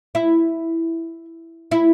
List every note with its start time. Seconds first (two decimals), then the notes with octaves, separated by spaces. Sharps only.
0.15 E4
1.71 E4